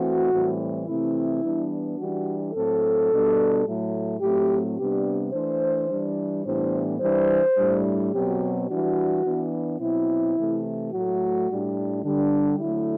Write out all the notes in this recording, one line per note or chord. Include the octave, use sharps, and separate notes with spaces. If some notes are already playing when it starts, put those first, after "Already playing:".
Already playing: E3 A3 C4 F#4
A2 E3 G3 C4
C3 E3 A3 C4 E4
E3 G3 B3 D4
E3 G3 D4 F#4
A2 F#3 C4 A4
B2 G3 D4
A2 F#3 A3
A2 F#3 A3 C4 G4
C3 G3 B3 D4 G4
E3 A3 D4 C5
E3 G3 D4
A2 E3 G3 B3 D4 C5
E3 G3 D4 C5
A2 G3 D4
B2 F#3 C4 G4
E3 G3 D4 F#4
E3 B3 D4
B2 F#3 C4 E4
C3 E3 A3
A2 F#3 A3 F#4
A2 G3 D4
D3 G3 D4
D3 F#3 A3 E4